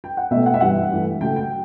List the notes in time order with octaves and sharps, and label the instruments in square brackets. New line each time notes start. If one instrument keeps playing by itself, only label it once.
[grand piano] G5
F#5
B2 A3 E5
F#5
E5
G2 E3 G3 F#5
G2 E3 A3
C#3 F#3 A3 G5
G5